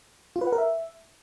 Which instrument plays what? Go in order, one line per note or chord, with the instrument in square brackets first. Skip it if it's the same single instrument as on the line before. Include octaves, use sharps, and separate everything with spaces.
[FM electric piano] F4
B4
F#5
A#4
E5